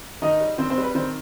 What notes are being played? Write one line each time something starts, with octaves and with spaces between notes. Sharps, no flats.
D#3 D#4 D#5
G3
D#3 C4 C5
C4 C5
G3 B4
D#3 C4 C5